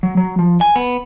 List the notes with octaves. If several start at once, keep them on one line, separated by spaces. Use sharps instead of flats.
F#3
F#3
F3
G#5
B3